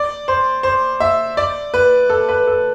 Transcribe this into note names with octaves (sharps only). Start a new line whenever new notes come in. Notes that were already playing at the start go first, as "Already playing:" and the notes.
Already playing: D5
C5
C5
E5
D5
B4
A4
B4
A4